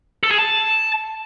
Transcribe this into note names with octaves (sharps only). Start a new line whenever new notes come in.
A4
G#4
A5